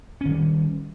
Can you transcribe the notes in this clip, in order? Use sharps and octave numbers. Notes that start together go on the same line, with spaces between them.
D#3 G3 C#4